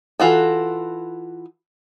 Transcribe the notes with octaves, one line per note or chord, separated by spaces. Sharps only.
E3 F4 F#4 A4